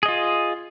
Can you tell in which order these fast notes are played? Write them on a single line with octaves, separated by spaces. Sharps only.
G#4 D#5 F4